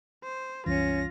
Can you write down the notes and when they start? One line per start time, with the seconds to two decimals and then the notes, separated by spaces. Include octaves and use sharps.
0.23 C5
0.66 C2 F#2 E3 C#4 F4 A#6